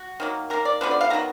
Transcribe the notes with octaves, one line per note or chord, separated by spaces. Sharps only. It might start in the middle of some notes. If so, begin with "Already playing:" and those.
Already playing: F#4
D#3 F#3 A#3
D#3 A#3 A#4
D5
D3 F3 B3 B4
D5
F5
D#3 F#3 B3 A#5